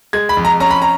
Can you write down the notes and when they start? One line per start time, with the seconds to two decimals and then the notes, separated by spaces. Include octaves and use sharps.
0.13 G#3 G#6
0.29 B5
0.37 F2
0.45 A#5
0.60 C#4 A#5
0.71 B5
0.82 A#5